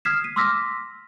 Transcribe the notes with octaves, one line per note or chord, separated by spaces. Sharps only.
D#6 F6 G#6 B6 C7 E7
D#7
C6 D6 E6 F6 A#6 B6